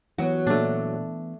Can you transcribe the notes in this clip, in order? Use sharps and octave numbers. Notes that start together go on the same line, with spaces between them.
E3 F#3 B3 F#4
A#2 A3 D4 D5